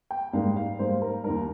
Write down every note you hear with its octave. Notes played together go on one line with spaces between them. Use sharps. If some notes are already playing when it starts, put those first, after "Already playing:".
G5
G#2 G3 A#3 F5
F5
G#2 G3 A#3 C5
A#4
D#2 D#3 G3 A#4